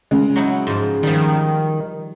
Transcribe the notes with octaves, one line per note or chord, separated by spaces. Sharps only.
C#3 G#3
F#3 D#4 E4
G#2 F3
D#3 F3 G3